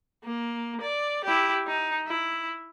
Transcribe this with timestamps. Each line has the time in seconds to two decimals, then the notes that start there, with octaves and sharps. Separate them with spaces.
0.24 A#3
0.81 D5
1.24 E4 G4
1.67 D#4
2.07 E4